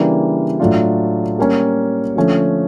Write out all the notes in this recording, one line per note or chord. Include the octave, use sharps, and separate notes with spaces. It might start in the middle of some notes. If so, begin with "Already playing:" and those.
Already playing: C#3 E3 G3 A#3 D4
A2 F#3 A3 D4 F4
G3 A#3 C#4
D3 F3 A3 C#4